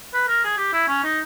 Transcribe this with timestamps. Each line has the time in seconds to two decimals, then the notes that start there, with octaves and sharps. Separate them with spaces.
0.14 B4
0.28 A#4
0.44 G#4
0.58 G4
0.73 E4
0.88 C#4
1.04 D#4